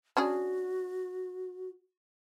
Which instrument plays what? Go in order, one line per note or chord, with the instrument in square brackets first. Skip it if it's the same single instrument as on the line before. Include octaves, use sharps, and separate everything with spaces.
[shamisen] C#4 D4 G#4 [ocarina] F#4